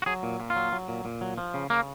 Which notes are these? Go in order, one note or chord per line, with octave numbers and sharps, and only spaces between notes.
F#4
F#3 G#4
A#2
A#2
F4
F#3
F#3
A#2
A#2
F#3
F3
C#3
C#3 A#3